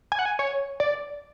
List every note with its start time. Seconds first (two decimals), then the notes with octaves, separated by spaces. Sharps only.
0.12 G#5
0.19 F#5
0.25 G#5
0.39 C#5
0.80 D5